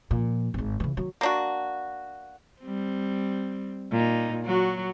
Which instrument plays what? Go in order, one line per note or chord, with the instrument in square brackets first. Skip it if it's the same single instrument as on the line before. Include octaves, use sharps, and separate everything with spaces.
[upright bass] A#2 F3
G#1 G#2
C#3 E3
D#3 F#3
[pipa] A#3 D4 F#4
[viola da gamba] G3 C4
A#2 D#4
F#3 F#4